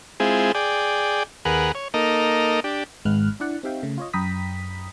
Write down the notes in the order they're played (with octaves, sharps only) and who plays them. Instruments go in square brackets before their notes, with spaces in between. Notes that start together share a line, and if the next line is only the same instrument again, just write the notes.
[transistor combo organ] G#3 C4 E4 F4 G#4
G#4 D5 G5
D#2 G#4 A#4 B4 F#5
C#5
A#3 D#4 A4 A#4 D#5
D4 G4
[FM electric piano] G#1 G#2 G#3 B4 F6 F#6
D4 E4 D5 F#5
C4 D#4 G4 E5 F5 G5
C#3 A3
F4 C#5 D#5
F#2 G5 A#5 B5 D#6 B6